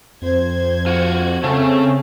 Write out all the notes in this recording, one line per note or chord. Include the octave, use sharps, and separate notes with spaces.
F2 C5 G#6
F4 F#4 F#5
C#3 A3 C4 C#4 A4